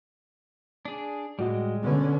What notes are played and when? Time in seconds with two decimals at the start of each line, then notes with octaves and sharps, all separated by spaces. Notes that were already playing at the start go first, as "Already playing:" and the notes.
0.85 D4 G#4
1.39 A2 G3 G#3 F#4 D#5
1.84 B2 D3 C#4 B4